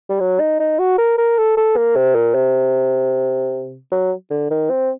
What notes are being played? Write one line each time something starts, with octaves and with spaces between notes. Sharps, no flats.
G3
F#3
D#4
D#4
F#4
A#4
A#4
A4
A4
A#3
C3
A#2
C3
F#3
D3
D#3
C4